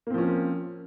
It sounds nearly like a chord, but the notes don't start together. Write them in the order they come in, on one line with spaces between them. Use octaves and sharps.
A#3 C4 F3 C#4